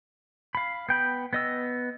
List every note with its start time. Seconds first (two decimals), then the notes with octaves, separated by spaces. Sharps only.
0.55 F5 B5
0.89 B3 G5 B5
1.33 B3 D#5 E6